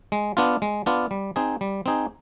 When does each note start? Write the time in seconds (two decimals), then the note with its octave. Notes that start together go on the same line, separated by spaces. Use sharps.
0.12 G#3
0.37 B3 D4 F4
0.62 G#3
0.86 B3 D4 F4
1.11 G3
1.36 C4 D#4 G#4
1.61 G3
1.86 C4 D#4 G#4